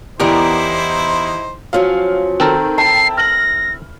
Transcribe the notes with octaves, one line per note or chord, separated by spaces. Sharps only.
E2 B3 D#4 E4 G4 A#4 C5 D5
F3 F#3 C#4 F5
D#3 C4 A4 A#4
E4 G5 A5 C7
F6 A#6 F#7